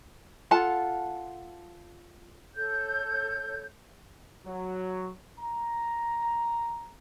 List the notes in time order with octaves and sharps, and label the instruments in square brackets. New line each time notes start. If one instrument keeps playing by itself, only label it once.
[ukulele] F4 A4 F#5 A5
[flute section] A4 C#5 G6
[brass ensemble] F#3
A#5